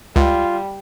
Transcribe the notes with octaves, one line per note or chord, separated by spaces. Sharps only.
C#2 G3 F4